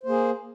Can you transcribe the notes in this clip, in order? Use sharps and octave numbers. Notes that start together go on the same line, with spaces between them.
A#3 G#4 C5